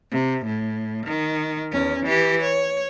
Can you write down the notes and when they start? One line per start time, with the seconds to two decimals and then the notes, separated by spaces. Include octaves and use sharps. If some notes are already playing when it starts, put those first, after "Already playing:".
0.11 C3
0.45 A2
1.06 D#3
1.72 E2 C#4
2.05 E3 G4
2.42 C#5